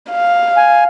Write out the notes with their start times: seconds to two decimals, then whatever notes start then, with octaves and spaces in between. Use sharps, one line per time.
0.11 F5
0.57 G#5